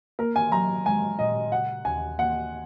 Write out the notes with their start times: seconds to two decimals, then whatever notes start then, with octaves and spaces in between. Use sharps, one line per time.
0.19 A#3 A#4
0.36 G#5
0.52 F#3 A#5
0.86 G#3 G#5
1.19 A#2 D#5
1.52 C#3 F#5
1.85 D#2 G#5
2.18 A#3 F#5